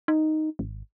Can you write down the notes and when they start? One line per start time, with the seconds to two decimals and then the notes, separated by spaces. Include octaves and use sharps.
0.08 D#4
0.59 G#1